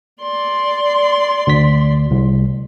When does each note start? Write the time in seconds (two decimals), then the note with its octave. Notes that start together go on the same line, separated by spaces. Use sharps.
0.22 D5 C6
1.47 D2 B6
2.11 C2